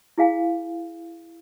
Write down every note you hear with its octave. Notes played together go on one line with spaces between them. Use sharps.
E4 G#4 F5 G#5